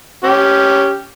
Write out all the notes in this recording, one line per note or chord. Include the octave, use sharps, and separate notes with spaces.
C#4 G4